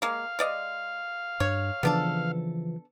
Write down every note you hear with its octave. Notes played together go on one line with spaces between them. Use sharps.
G#3 A#3 F5
G#3 D5 D#5
G2 C#5
C#3 E3 F3 B3 D4 A4